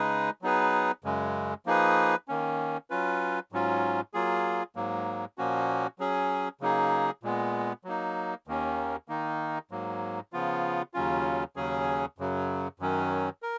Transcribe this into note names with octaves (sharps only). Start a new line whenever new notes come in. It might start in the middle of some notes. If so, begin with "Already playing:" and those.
Already playing: C#3 G#3 D#4 G#4 B4
F#3 B3 D#4 G#4 B4
F#2 C#3 G#3
F3 A#3 D#4 G#4 B4
D#3 A#3 C#4
F#3 C#4 F4 B4
G#2 F#3 C#4 F4
F#3 A#3 F4 G#4
G#2 F#3 A#3
A#2 F3 A#3 C#4 F#4
F#3 C#4 G#4
C#3 F#3 A#3 D#4 G#4
A#2 G#3 B3
F#3 A#3 D#4
D#2 D#3 A#3 C#4
D#3 A#3 D#4
G#2 F#3 A#3
C#3 F3 B3 F4
D#2 C#3 F#3 C#4 F4
D#2 C#3 F#3 C#4 G#4
F#2 C#3 F#3
F#2 D#3 F#3 C#4
A#4